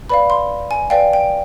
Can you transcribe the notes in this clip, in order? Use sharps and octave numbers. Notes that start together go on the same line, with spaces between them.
B4 D5 F5 B5
C6
G#5
B4 D5 F5 G5
G5